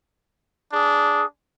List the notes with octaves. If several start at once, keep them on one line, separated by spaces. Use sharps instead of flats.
D4 G#4